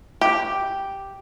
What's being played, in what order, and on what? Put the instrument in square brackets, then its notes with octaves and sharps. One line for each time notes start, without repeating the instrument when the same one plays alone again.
[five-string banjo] G4